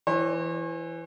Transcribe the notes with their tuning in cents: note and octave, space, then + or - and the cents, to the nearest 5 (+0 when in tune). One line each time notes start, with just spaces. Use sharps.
E3 +15 C#5 -40